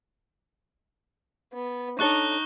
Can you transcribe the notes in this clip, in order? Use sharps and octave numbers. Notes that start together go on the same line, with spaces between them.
B3
D4 D#4 A4 C#5 C#6 F#6 G7